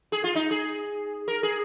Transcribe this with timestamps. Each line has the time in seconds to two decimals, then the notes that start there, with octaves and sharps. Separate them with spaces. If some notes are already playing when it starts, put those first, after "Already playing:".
0.12 G#4
0.24 F4
0.35 D#4
0.51 G#4
1.28 A#4
1.43 G#4